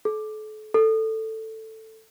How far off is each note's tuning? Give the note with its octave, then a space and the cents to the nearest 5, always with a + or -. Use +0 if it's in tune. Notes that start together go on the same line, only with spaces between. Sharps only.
A4 -35
A4 +10